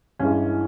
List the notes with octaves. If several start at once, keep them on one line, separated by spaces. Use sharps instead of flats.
A1 G2 E3 G#3 C#4